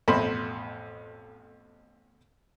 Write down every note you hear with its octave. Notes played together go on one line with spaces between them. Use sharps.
A1 F2 B2 C5 B5